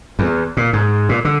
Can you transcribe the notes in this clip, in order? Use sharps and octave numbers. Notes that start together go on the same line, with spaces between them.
E2
A#2
G#2
A#2
D3